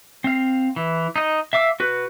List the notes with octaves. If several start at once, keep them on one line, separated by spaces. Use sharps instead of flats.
C4 F5
E3
D#4 D#5
E5 F5 D6 E6
F#4 B4